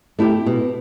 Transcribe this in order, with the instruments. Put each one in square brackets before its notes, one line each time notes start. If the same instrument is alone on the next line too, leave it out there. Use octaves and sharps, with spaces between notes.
[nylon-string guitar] A3 E4 G4
B2